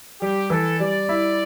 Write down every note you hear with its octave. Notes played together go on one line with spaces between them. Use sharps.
G3 G4
E3 A4
G3 D5
E4